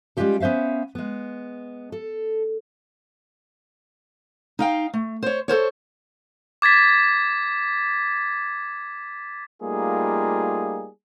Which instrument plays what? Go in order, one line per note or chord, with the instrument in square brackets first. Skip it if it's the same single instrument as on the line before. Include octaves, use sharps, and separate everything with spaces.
[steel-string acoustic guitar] G3 G#3 C#4 F4 G4 A4
B3 C#4 C5 E5 F5
G#3 B3
A4
D#4 F5 G5
A3
C5 C#5
A4 A#4 C5 C#5
[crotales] D6 G#6 A6 B6
[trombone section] G3 A3 A#3 D#4 F4 G#4